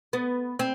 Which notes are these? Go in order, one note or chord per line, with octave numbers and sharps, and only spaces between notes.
B3
C4